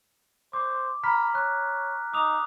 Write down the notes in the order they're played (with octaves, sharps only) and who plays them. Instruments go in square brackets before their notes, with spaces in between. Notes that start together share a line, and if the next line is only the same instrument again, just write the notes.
[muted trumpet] C5 [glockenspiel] D6
[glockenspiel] A#5 F6 B6 [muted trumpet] B5
[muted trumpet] C#5 [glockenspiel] F#6
[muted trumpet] D#4 [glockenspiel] D6 D#6 F7